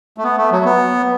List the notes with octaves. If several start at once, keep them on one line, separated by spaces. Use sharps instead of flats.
A3
B3
A3
F#3
B3